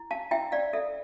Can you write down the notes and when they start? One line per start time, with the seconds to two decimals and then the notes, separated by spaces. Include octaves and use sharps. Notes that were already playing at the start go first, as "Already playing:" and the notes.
Already playing: E4
0.11 F5 A5
0.31 E4 E5 G5
0.52 D5 F5
0.73 A4 E5